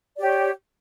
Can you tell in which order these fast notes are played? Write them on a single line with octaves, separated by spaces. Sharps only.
D5 G4 C#5